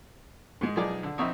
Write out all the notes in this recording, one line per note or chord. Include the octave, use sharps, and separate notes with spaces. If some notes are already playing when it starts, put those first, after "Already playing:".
G#2 G#3
B1 F3 D#4 G#4 D5 D6
D3
A#1 C4 D#4 E5 C#6 D#6